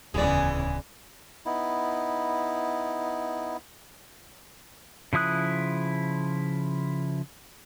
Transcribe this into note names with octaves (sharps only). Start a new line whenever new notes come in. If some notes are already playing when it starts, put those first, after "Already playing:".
D1 E2 C#3 E3 G#3 B3 G#4 D5
B3 D#4 E4
C#3 F3 E4 D#6 F#6